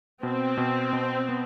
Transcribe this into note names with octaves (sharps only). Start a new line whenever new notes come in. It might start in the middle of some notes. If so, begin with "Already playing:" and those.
B2 C4
B2
B2
B3